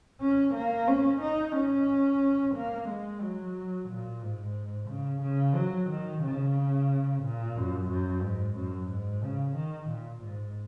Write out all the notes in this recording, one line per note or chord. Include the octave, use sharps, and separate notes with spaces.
C#4
A#3
C#4
D#4
C#4
A#3
G#3
F#3
A#2
G#2
C#3
C#3
F#3
D#3
C#3
A#2
F#2
F#2
G#2
F#2
G#2
C#3
D#3
A#2
G#2